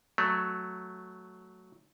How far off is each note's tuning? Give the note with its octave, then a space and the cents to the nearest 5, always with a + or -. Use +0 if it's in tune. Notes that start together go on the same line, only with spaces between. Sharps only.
F#3 +0 A3 +0